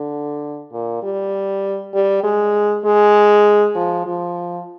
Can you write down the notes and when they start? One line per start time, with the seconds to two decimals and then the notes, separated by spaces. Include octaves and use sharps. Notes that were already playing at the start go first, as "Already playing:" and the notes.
Already playing: D3
0.72 A#2
1.03 G3
1.94 G3
2.23 G#3
2.85 G#3
3.75 F3
4.06 F3